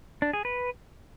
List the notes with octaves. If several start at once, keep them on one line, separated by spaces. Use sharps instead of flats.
D4
G#4
B4